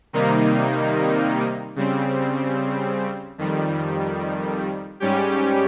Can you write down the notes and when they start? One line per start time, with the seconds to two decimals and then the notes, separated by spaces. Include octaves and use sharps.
0.13 C3 D#3 G3 A#3 D#4
1.76 C#3 G3 C4
3.38 F2 D#3 G3
5.00 G#2 G3 C#4 G4